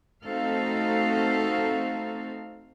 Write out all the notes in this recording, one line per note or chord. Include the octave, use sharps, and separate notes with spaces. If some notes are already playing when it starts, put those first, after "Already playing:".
A3 C4 D#4 F#4 A4 F5